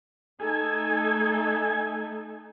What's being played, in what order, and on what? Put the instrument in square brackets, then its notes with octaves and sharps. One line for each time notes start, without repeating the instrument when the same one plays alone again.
[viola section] A3 D#4 A4 [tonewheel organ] G#5